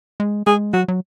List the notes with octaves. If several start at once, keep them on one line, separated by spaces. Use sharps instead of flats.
G#3
G#3 G#4
F#3 F#4
F#3